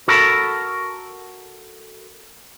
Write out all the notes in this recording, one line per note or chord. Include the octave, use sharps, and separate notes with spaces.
F#4 A4 A#4 A5 B5